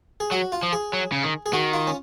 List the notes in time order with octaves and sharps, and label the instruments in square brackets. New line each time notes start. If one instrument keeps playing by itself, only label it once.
[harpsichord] G#4
[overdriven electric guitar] F#3 [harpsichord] F#4
[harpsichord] F4
[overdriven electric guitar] F3
[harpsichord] G#4
[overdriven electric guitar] F#3
C#3
D#3
[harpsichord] G#4
[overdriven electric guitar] D#3 [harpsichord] F#4
[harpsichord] F4
C#4